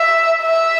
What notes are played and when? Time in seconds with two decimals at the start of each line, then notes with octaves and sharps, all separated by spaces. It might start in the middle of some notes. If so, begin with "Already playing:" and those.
Already playing: E5
0.42 E5